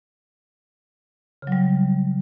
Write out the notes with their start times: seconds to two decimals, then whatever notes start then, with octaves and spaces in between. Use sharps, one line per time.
1.42 C#3
1.47 F#3
1.52 G3